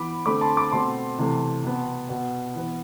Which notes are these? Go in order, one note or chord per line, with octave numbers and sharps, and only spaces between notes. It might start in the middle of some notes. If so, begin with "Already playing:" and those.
Already playing: E3 B3 B5 D6
D3 A3 C4 B5 D6
A5 C6
B5 D6
B2 A3 C4 A5 C6
C3 E3 A3
B2 B3
B2 B3
E3 B3